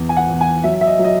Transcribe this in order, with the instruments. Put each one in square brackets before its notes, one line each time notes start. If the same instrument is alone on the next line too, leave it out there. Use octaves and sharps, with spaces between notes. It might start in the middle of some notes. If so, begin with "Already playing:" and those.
Already playing: [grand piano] E2
G#5
F#5
E2
G#5
F#3 E5
E5
D#5
F#3
D#5